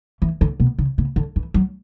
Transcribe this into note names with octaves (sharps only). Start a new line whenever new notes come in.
E3
D3
B2
C#3
C#3
D3
E3
F#3